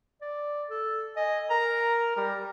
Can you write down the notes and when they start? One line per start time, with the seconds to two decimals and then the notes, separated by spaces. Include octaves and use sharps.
0.22 D5
0.70 A4
1.17 D#5 G#5
1.50 A#4 A#5
2.16 G3 A#4